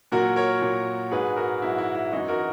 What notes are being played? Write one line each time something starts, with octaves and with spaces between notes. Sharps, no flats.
A#2 F#3 F#4 A#4
A#4 C#5
A#2 F#3
G#2 F#3 G#4 B4
F#4 A#4
G#2 F#3 E4
E4
E4
F#2 E3 G#3 D#4 F#4
F#4 A#4